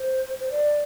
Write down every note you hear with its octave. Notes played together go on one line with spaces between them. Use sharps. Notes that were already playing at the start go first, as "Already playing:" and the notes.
Already playing: C5
C5
D5